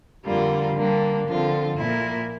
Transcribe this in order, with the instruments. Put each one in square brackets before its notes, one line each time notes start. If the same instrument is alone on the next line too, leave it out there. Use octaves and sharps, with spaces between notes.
[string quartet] F2 D3 G3 A#3 F4
D3 G3 A#3 D4
D3 F3 C4 F4 A4
A#2 F3 A#3 E4